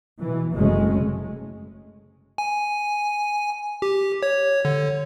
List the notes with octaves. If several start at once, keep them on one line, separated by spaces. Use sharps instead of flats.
B2 E3
F#1 C3 F#3 G#3 A3 C#4
G#5
G4
C#5
D3